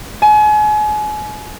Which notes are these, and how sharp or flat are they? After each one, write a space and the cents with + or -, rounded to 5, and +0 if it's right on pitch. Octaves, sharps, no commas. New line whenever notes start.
G#5 +35